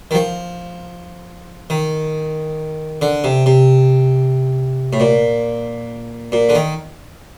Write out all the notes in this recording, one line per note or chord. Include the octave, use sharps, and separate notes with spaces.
D#3
F3
D#3
D3
C3
C3
A2
A#2
A#2
D3
D#3